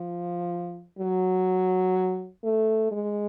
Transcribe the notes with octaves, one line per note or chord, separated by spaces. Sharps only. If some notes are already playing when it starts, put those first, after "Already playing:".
Already playing: F3
F#3
A3
G#3